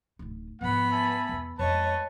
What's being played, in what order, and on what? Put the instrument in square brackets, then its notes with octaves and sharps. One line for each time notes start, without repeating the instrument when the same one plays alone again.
[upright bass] D1 D#4
[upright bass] G#2 F3 [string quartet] B3 B5 [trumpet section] F#5
[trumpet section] E5 G#5 A5
[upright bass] E2 E3
[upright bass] F2 G#3 [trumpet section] B4 A5 [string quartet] C#5 D#5